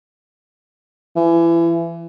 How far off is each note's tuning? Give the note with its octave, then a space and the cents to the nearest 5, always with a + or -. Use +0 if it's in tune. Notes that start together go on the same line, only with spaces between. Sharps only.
E3 +30